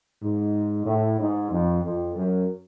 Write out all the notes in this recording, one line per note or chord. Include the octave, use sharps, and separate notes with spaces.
G#2
A2
G#2
F2
F2
F#2